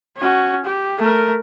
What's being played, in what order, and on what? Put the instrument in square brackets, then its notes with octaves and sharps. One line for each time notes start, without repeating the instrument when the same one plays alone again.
[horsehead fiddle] C#4 F#4
G4
A3 A#4